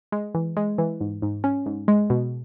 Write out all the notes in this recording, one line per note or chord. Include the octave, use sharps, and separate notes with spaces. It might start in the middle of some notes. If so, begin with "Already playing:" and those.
G#3
E3
G#3
E3
G#2
G#2
C#4
G#2
G#3
B2